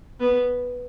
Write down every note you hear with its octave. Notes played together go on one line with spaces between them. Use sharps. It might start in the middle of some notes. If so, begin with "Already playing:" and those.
B3